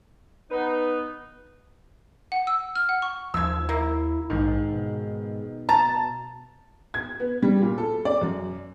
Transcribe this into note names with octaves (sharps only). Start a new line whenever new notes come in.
B3 D#4 B4
F#5
E6
F6
F#5
C#6
D#2 F3 E6 G#6
A#3 E4
A#1 G#2 D#3
B2
A5 A#5 A6
G#6
B3
G3
A#2
A4
D5
F#2